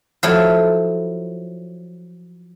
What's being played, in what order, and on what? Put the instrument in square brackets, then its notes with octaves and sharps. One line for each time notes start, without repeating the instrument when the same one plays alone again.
[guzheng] F3 F#3 E4 A4